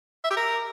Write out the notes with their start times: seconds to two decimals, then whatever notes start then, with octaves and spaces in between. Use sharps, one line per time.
0.24 E5
0.30 G4
0.37 A#4